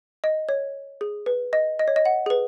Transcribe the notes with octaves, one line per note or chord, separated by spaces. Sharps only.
D#5
C#5
G#4
B4
D#5
D#5
C#5
D#5
F#5
G#4
B4